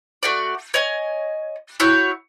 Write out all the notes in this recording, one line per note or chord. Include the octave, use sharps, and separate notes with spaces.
A3 F#4 D5
C#5 D#5 G#5
E4 F#4 C#5 G6